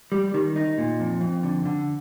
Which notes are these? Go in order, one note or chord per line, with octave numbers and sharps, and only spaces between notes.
G3
D#3
D#4
A#2
F2
F2
D3
D3